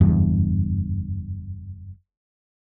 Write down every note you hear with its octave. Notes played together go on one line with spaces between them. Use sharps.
F#1 E2 G2